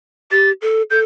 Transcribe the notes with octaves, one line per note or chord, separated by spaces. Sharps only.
G4 A6
A4
A4 G6